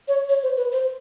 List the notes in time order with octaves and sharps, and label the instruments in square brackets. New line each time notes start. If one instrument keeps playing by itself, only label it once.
[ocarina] C#5
C#5
C5
B4
C5